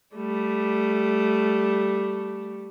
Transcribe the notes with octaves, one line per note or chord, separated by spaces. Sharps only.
G3 A3